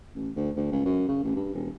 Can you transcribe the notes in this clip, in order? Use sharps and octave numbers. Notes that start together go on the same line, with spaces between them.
A1
D2
D2
C#2
F#2
C#3
A1
G2
E1